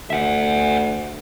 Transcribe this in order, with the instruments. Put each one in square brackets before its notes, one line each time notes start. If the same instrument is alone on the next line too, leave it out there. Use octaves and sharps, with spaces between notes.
[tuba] D2 [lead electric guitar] E5 F#5